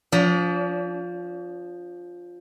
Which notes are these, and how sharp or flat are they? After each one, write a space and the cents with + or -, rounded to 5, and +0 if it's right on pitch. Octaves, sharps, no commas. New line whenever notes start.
F3 +10 D4 -40